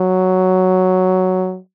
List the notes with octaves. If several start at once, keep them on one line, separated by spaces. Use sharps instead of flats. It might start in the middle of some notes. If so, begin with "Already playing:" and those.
Already playing: F#3